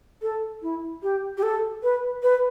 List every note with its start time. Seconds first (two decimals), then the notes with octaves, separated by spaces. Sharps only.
0.22 A4
0.62 E4
1.03 G4
1.37 G4
1.43 A4
1.83 B4
2.23 B4